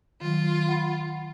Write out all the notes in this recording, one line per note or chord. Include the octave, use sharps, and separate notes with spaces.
D#3 F#3 F4
F#5 B5